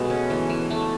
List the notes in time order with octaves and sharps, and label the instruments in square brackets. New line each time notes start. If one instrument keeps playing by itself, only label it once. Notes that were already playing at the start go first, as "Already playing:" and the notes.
Already playing: [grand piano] B2 B3 [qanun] G#3 A3
[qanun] C#4
E3
E3
A3